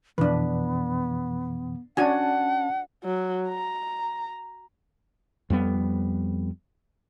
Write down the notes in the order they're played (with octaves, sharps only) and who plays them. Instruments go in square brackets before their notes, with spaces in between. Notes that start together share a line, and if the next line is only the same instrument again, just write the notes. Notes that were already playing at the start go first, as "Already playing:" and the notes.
[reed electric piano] F2 B2 E3 [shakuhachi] B3 [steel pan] D4 B4
[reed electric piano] C#4 A5 [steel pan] D4 F#4 G#5 [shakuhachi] F#5
[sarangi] F#3
A#5
[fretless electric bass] F2 G3 B3